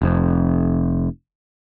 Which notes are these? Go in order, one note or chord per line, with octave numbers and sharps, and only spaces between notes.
F1 F2